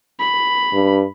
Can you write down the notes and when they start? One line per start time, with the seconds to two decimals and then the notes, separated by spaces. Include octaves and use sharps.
0.19 B5
0.73 G2